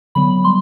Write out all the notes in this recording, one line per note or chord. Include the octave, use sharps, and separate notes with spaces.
D3 F#3 B3 B5
G3 C6